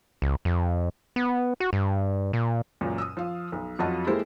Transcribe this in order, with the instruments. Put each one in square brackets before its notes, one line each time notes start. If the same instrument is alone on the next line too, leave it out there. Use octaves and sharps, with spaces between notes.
[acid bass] C#2
F2
B3
F#4
G2
A#2
[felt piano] C#2 F#2 A#2
D#6 E6
F3 F5
B1
F2 F#3 F4 F#4 D#5 A5
G#3 A#3 E4 G4 A4 C5